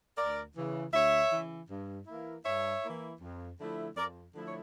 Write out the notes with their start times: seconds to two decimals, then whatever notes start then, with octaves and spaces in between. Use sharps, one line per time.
0.18 D2 A#4 D5
0.56 C#3 E3
0.93 D2 C#5 E5
1.32 C#3 E3
1.70 G2
2.07 E3 A#3 E4
2.45 G2 C#5 E5
2.83 E3 A#3 E4
3.21 F2
3.59 D3 F3 A3 E4
3.96 F2 A#4 D5
4.35 D3 F3 A3 E4
4.47 C#5